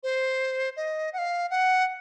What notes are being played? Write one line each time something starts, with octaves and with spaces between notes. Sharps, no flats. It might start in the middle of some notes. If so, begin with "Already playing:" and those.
C5
D#5
F#5
F5
F#5